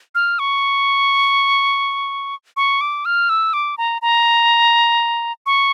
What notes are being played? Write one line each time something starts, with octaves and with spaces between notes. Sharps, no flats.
F6
C#6
C#6
D6
F6
E6
D6
A#5
A#5
C#6